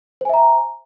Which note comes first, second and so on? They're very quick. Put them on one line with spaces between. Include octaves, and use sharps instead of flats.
C5 G#5 E5 A#5